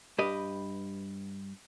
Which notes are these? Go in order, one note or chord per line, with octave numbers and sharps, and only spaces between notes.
G2 G4 B4 D#5